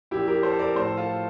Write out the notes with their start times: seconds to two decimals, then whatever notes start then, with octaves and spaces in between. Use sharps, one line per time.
0.11 A#2 F3 E4 G4
0.27 G4 A#4
0.43 A4 C5
0.59 A#4 D5
0.75 A2 F3 A4 C5
0.97 F4 A4